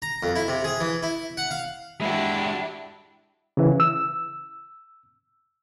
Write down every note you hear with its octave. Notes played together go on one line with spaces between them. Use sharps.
A#5
F2
E4
C3
G#4
E3
E4
F#5
F5
G#3 D4 E4 F#4 G4
C#3 E3
E6